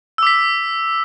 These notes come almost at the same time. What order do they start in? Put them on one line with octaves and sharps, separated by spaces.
E6 D6 B6